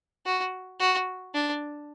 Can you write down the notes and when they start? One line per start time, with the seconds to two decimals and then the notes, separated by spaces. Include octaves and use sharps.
0.26 F#4
0.80 F#4
1.34 D4